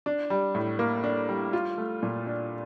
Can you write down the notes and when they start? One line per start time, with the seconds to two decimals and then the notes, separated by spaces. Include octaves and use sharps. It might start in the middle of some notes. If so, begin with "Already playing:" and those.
0.06 D4
0.30 G3
0.55 A2
0.79 A#3
1.04 D4
1.29 G3
1.53 F4
1.78 A3
2.03 A#2
2.26 D4